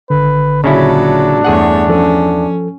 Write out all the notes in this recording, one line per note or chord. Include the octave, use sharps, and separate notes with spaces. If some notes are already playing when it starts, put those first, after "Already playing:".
G#1 D3 B4
A#2 C#3 F#3 C#4 D4 E4 A4
E2 G2 A3 G#4 C#5 F#5
F3 C#4 A4